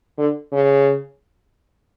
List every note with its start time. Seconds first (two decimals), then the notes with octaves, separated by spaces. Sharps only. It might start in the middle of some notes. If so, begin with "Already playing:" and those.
0.18 D3
0.52 C#3